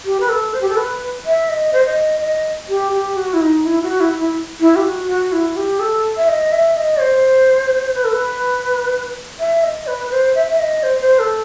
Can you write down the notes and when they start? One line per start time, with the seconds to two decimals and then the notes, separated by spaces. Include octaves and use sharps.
0.05 G4
0.20 B4
0.29 A4
0.53 C5
0.61 G4
0.69 A4
0.77 B4
1.25 E5
1.49 D#5
1.73 C5
1.85 D#5
2.21 D#5
2.69 G4
2.92 G4
3.16 F#4
3.33 E4
3.41 D#4
3.65 E4
3.82 F#4
4.00 E4
4.18 E4
4.60 E4
4.76 G4
4.85 F#4
5.08 F#4
5.32 E4
5.56 G4
5.80 A4
6.17 E5
6.28 D#5
6.52 E5
6.76 D#5
7.00 C5
7.96 B4
8.04 A4
8.13 B4
9.39 E5
9.63 D#5
9.87 B4
10.11 C5
10.35 E5
10.51 E5
10.59 D#5
10.83 C5
11.01 C5
11.19 A4